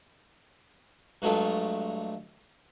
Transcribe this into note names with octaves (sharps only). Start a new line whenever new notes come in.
G2 F#3 G#3 A3 F4